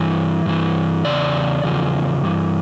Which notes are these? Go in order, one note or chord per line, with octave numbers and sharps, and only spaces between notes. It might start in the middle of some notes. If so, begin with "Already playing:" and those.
Already playing: G2 E3
G2 E3
E2 C#3 D5
E2 C#3 F3
G2 E3